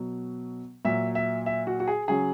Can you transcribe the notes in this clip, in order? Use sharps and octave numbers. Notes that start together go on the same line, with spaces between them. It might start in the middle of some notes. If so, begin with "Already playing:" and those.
Already playing: B2 F#3
A#2 F#3 E5
E5
E5
F#4
F#4
G#4
C#3 F#3 G#4